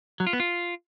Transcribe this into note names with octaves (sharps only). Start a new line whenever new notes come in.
F#3
F4
B3
F4